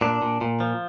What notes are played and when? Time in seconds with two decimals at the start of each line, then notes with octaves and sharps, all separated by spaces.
0.01 A#2 D4
0.22 A#2
0.41 A#2
0.60 F3